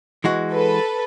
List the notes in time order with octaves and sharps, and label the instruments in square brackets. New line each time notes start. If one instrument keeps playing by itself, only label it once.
[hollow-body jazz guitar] E3 G#3 F#4
[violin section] A4 B4